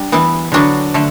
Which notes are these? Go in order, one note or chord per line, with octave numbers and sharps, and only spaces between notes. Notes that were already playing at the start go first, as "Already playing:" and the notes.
Already playing: G3 D4
E3 B3 E4
D3 F#3 B3 D4 F#4
D3 A3